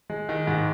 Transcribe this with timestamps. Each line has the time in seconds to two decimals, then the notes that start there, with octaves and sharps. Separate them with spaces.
0.10 G#3
0.29 D#3
0.47 G#2